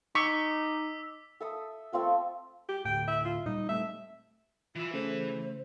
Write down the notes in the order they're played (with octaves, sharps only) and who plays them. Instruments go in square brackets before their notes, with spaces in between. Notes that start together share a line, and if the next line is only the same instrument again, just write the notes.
[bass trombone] D#4 [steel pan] C#6 [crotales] D6 E6 [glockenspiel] B6
[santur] A4 E5 D#6
A3 C4 F4 A4
[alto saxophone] G4
[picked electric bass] D2 A2 [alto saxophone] G5
[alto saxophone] E5
F4
[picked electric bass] A#2 G3 [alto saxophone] D#4
[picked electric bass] G3 A3 C4 [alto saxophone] E5
[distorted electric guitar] E3 E5 [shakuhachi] F4
[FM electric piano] C#3 A3 [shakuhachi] C5